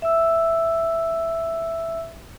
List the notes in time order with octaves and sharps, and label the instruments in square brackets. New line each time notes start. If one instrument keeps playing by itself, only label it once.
[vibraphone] E5 E6